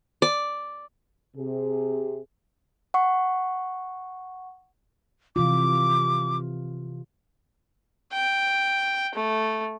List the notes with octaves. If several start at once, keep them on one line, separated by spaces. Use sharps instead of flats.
D5
C3 G#4
F#5 C#6
C3 E3 F4 D6
G5
A3